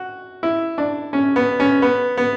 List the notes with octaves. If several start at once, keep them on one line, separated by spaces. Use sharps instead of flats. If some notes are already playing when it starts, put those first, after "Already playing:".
Already playing: F#4
E4
D4
C#4
B3
C#4
B3
B3